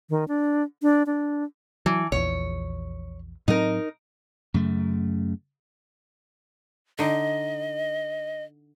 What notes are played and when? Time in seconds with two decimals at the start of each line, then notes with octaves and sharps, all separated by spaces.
0.10 D#3
0.28 D4
0.82 D4
1.06 D4
1.86 E3 F#3
2.12 A#1 E2 C#5
3.48 A2 F#3 C4 D#4 A#4
4.54 F#2 C#3 A3
6.99 D3 D#4 D#5